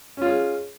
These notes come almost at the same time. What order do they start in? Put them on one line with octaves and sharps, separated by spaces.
C#4 F4 G#3